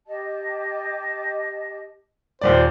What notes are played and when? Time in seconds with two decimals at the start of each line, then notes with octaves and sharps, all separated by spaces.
0.07 G4 D#5 A5
2.41 D#2 A#2 C5 D5